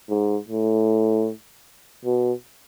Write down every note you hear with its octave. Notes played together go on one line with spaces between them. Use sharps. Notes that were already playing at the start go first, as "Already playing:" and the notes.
G#2
A2
B2